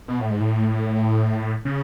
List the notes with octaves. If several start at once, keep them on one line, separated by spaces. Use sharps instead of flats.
B2
A2
G#2
A2
C#3